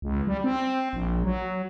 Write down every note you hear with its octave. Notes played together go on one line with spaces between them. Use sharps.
C#2
G3
C4
A#1
F#3